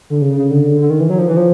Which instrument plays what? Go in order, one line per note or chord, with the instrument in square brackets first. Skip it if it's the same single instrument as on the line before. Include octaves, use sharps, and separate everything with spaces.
[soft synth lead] D3
C#3
C#3
D3
D3
D#3
E3
F#3
F3
E3
F3